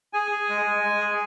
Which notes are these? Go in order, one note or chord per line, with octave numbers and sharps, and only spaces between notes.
G#4 G#5
G#4
G#3
G#3
G#3
G#4